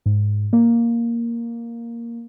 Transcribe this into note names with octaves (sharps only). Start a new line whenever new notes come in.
G#2
A#3